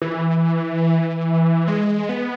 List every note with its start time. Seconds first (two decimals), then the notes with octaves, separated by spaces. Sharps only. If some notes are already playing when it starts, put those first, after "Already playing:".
0.02 E3
1.68 G#3
2.09 B3